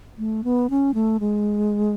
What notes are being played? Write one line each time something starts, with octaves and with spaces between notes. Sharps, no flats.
A3
B3
C#4
A3
G#3